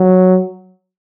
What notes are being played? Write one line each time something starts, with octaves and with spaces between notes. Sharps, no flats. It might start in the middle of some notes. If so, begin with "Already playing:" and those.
Already playing: F#3